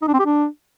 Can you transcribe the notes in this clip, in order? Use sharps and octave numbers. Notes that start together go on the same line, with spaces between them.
D#4
D4
C4
G4
D4